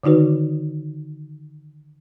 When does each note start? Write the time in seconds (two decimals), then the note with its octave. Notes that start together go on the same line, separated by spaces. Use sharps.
0.04 D3 D#3 D#4 F#4 B4